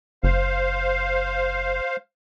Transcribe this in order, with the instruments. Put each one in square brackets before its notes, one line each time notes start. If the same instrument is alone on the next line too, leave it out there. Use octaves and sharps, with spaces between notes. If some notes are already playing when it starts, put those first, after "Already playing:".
[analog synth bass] F#1 [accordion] C5 F5